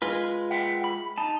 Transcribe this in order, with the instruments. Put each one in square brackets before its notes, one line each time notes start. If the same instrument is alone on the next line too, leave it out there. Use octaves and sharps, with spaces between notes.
[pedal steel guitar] G#3 F4 B4
[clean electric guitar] E5 F#5 G5
B5
[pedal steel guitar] D#4 A5